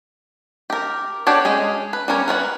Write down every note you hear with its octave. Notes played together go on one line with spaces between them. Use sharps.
G4 A#4
D4 F#4 G4 A4 C#5
G#3 C#4 G#4
B4
G3 C#4 A#4 C#5
A#4 B4 C#5 F#5